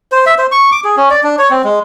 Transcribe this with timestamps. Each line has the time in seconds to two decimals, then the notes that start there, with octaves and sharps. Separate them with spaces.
0.12 C5
0.26 E5
0.38 C5
0.52 C#6
0.72 D6
0.84 G#4
0.97 C#4
1.10 D5
1.24 D4
1.38 C#5
1.51 C4
1.64 G#3